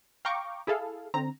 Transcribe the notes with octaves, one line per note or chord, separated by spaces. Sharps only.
F5 G5 A#5 C#6 D6
E4 G#4 A4 F5
D3 C4 A#5